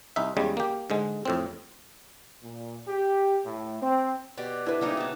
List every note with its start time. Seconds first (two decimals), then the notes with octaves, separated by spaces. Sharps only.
0.16 C2 D#4 E5
0.37 E2 C#3 G3 G#3
0.57 A#3 G4
0.90 G#2 D3 G#3
1.25 F2 A2 C4
2.43 A#2
2.88 G4
3.46 A2
3.82 C4
4.37 B2 G4 D5
4.66 D4 E4 B4
4.81 C#3 G3 A#3 C4 D#4 E4
4.97 B2 A5